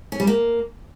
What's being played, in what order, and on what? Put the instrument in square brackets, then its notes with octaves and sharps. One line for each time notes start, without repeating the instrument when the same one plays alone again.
[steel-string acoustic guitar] C#4
G3
A#3